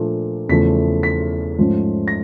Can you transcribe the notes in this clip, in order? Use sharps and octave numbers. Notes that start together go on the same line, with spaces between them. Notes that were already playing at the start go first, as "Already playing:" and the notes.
Already playing: A#2 F3 A3 D4 F4
E2 C#3 F3 A3 B6
B6
G#2 F3 A3 C#4
A#6